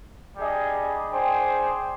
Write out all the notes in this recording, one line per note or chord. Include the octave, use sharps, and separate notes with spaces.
G3 D4 G#4 D#5
D4 G#4 C5 G5